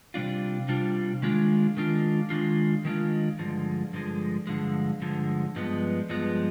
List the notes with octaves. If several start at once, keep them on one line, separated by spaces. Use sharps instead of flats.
C3 G3 D4 F4
C3 G3 D4 F4
D#3 G#3 D4 F4
D#3 G#3 D4 F4
D#3 G#3 D4 F4
D#3 G#3 D4 F4
G2 D3 F3 G#3
G2 D3 F3 G#3
G2 D3 F3 G#3
G2 D3 F3 G#3
G2 F3 G#3 B3
G2 F3 G#3 B3